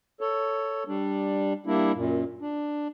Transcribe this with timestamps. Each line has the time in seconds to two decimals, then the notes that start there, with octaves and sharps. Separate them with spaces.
0.21 A4 C#5
0.88 G3 D4
1.66 G3 A#3 D4 E4
1.95 F#2 A#2
2.41 D4